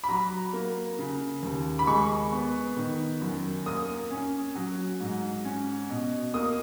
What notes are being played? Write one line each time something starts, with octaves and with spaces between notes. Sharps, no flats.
B5
F#3 A#5
A#3
C#3
D#2
B5
G#3 C#6
B3
D#3
F#2
A#3 D#6
C#4
F#3
G#2
C#4
B2
A#3 D#6